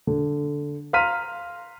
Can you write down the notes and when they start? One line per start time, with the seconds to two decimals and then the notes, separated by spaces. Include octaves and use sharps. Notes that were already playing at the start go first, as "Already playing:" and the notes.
0.07 D3
0.93 F5 A#5 C6 F6 B6 D#7